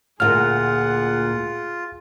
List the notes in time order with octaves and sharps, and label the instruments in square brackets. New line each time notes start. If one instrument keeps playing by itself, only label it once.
[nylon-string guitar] D2 A#2 [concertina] F4 [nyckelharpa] G#4 F#5 [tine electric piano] F6